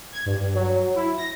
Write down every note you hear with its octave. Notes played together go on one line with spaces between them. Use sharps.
G#6
G2
F#3
E4
A#6